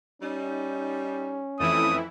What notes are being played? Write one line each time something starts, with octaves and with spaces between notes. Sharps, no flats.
G3 C#4 D#4
F2 E3 A3 E4 D#6